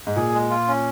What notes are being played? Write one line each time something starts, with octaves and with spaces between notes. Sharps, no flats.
G#2
A#2 G#4
G#3
F4
C#4